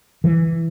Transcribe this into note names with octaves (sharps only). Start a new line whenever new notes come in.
E3